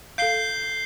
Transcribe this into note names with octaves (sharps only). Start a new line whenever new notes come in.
A4 F5 G6 C7 G7